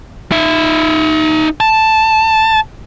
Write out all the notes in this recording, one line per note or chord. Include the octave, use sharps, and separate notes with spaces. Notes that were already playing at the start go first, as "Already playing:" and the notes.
D#4 E5
A5